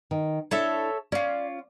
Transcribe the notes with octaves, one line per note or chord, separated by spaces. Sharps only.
D#3
D4 E4 A4 C#5 E5
C#4 F4 D5